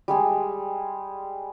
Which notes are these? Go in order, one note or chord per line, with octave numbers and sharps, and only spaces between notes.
G3 G#3 G#4